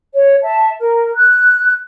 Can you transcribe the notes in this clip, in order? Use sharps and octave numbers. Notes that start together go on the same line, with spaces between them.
C#5
E5 A5
A#4
F#6